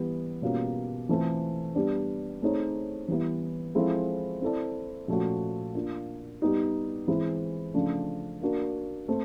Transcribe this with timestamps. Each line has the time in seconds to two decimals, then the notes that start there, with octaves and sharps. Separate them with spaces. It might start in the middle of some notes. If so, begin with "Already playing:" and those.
Already playing: E3 G3 B3
0.42 B2 G3 A#3 C#4 F4
1.09 E3 A3 C4 F4 A4
1.75 G3 B3 D4
2.41 A3 C4 D#4 G#4 C#5
3.08 E3 G3 B3 E4
3.75 F3 G#3 C4 E4 A4
4.41 C4 E4 A4 D5
5.08 A#2 F3 A3 C#4 F#4
5.75 A#3 D4 F4
6.42 G3 B3 D#4
7.08 E3 G#3 C4 E4
7.74 C#3 F3 A3 D4
8.41 A#3 D4 F#4 A#4
9.08 A3 C4